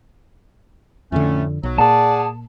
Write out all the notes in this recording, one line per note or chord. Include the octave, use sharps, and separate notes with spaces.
F2 A2 D3 A3 C#4
B1 F#3
A#2 G#4 D5 F#5 A5